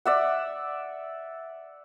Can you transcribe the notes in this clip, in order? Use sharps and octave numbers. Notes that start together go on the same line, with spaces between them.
D5 E5 F#5